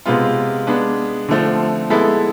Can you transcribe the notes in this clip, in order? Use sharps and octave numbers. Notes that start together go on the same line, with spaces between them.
C3 G#3 B3 F4
G#3 B3 D4
D3 F3 A3 C4
G#3 B3 E4 A4